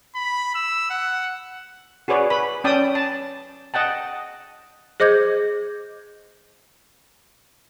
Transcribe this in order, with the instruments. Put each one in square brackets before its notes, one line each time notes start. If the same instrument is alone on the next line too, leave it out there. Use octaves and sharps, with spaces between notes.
[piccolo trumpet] B5
E6
F#5
[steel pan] F#4 G#4 B4 C#5 D5
B4 B5
C#4 D5 G5 A5 D#6
A5
D#5 F#5 G5 A5
[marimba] G#4 C5 D#5 D6 G6 G#6